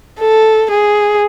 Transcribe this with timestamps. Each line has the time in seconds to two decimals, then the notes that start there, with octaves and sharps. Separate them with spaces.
0.19 A4
0.71 G#4